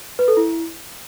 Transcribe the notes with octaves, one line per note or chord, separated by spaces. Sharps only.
B4
A4
E4